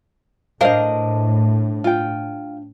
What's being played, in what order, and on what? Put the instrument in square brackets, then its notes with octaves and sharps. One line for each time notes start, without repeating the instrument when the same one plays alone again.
[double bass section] A2 [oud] D4 C5 F5 [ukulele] A#4 D#5
[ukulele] F4 G5